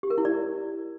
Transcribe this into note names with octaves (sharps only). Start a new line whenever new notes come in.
G4
A#4
E4
D5